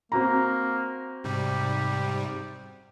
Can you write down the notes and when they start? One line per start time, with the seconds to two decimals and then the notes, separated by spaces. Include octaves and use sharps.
0.12 A#3 C4 F#4 A#5
1.24 G#2 C3 G3 G4